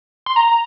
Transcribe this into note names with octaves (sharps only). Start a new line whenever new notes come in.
C6
A#5